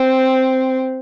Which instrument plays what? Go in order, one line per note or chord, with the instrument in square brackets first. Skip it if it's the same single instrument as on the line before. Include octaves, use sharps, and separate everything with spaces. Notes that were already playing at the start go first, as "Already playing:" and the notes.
Already playing: [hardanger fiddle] C4